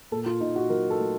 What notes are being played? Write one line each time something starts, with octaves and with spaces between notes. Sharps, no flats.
A#2 A4
F4
A#2 D#4
F#4
F#3 A#4
A4
A3